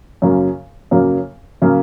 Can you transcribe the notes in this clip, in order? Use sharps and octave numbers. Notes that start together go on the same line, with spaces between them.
F#2 C#3 F#3 A#3
F#2 C#3 F#3 A#3
C#3 F#3 A#3